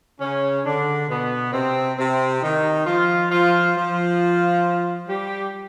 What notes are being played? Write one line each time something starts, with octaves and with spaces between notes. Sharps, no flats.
C#3 C#4
D3 D4
B2 B3
C3 C4
C3 C4
D#3 D#4
F3 F4
F3 F4
F3 F4
G3 G4